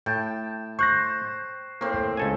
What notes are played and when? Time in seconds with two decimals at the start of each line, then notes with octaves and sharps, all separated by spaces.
0.06 A2 G5 A5
0.79 C5 C#6 F#6 A#6
1.81 A2 A#3 C4
2.17 C#2 A4 G#5